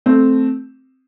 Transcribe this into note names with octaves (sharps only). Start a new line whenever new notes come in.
A3 C4